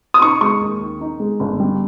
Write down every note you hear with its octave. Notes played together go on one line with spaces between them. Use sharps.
D#6
D#4 C#6
G#3 C#6
D#2
D#3
D#4
G#3
G1
G3